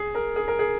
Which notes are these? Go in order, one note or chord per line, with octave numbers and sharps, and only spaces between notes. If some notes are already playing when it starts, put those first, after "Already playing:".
Already playing: G#4
A#4
G#4
A#4
G#4